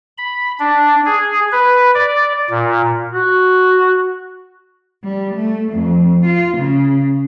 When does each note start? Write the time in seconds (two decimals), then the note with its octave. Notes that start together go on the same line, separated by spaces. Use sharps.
0.18 B5
0.60 D4
1.06 G#4
1.52 B4
1.95 D5
2.50 A#2
3.12 F#4
5.04 G3
5.35 A3
5.73 F2
6.25 F4
6.58 C#3